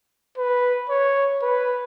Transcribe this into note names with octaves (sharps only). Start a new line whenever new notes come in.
B4
C#5
B4